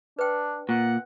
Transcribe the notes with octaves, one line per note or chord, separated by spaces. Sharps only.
D4 B4 G5
A#2 F#5